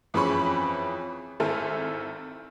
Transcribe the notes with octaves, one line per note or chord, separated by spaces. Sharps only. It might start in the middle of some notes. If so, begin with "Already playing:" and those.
F2 E3 C#4 G#4 B5 C#6
G#1 C4 E4 A4 G#5 F6